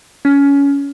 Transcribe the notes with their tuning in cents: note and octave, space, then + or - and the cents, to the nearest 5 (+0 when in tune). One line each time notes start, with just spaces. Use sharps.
C#4 +20